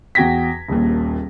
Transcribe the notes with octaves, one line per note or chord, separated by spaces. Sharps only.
E2 F#4 G5 G#6 A#6 B6
D#1 A#1 D#2